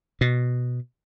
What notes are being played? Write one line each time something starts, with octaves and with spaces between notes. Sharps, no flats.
B2